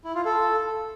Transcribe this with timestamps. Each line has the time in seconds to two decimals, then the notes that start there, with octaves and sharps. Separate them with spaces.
0.05 E4
0.15 F4
0.25 A4